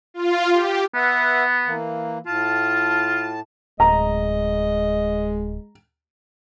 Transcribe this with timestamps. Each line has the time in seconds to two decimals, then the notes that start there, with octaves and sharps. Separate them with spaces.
0.14 F4
0.53 G4
0.94 B3 B4 E5 F#5
1.66 E3 A#3
2.26 A2 F4 A5
3.80 D1 G#3 D#5 A#5